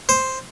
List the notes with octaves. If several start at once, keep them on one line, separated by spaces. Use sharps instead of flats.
C5